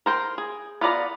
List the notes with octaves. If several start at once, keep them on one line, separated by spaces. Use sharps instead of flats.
A#4 C5 G5
G#4
B3 F4 D5 A#5